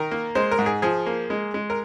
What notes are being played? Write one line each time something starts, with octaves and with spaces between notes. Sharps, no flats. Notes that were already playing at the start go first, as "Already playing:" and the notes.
Already playing: D#3 A#4
A#3
G#3 C5
A#4
G#2
G#4
F3 G#4
A#3
G#3
G#3
A#4